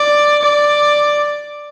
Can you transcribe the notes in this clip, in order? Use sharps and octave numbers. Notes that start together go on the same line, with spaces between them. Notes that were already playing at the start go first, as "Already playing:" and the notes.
Already playing: D5
D5